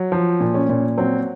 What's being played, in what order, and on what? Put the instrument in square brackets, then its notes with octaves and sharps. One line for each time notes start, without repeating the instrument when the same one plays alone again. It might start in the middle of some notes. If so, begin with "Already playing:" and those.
Already playing: [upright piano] F#3
F3
A#2
C#4
A#2
F#3 C4